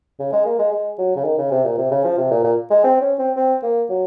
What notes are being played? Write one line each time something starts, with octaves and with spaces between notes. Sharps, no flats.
C#3
G#3
A#3
G#3
G#3
F#3
C#3
D#3
C#3
C3
A#2
C3
C#3
F3
C3
A#2
A#2
G#3
C4
C#4
C4
C4
A#3
F#3